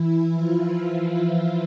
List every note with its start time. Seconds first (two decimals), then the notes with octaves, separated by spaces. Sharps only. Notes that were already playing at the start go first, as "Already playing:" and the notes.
Already playing: E3 E4
0.29 F3 F4